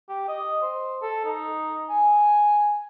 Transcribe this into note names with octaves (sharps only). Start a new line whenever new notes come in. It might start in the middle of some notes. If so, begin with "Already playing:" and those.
G4
D#5
C5
A4
D#4
G#5